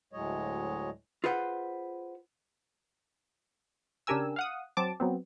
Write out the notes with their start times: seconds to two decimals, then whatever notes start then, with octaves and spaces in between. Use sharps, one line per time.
0.13 D2 A2 F#3 G#3 C#5 D#5
1.24 F4 G#4 B4 C5 F#5
4.07 C#3 D4 G4 A#4 G#5 E6
4.36 F5 F#5 D#6
4.77 F#3 C4 A5 D6
5.00 F#3 B3 C4